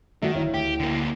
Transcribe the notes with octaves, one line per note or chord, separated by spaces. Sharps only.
D#3 A3 F#4 D5 E5
D1 E4 C#5 F5
D2 G4
D3 A#3